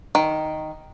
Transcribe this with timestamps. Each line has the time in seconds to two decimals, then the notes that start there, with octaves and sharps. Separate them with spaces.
0.15 D#3